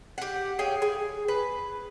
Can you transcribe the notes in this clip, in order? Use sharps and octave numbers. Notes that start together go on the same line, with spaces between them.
G4 F#5
G#4 C#5 F5 G5
G#4
B4